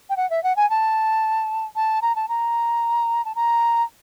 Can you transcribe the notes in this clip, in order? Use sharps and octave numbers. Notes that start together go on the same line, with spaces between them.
G5
F#5
E5
F#5
G#5
A5
A5
A#5
A5
A#5
A5
A#5